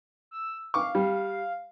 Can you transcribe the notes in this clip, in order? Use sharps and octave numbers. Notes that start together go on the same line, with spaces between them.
E6
F5 C#6 D6
G3